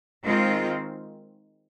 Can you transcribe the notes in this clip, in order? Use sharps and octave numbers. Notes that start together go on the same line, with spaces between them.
D#3 G#3 C4 F4